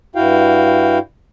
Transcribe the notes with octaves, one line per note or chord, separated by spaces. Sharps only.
G2 E4 F#4 F5 G5